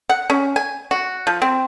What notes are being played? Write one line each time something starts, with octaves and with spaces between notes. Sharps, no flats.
F#5
C#4
G#5
F#4
F3
C4